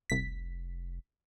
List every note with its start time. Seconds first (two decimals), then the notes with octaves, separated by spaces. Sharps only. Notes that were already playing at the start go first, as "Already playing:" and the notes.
0.10 F1 C2 B6